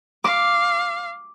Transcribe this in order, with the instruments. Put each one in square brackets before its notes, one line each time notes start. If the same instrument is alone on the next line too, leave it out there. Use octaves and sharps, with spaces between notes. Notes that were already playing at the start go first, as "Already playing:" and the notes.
[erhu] F5 [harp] D6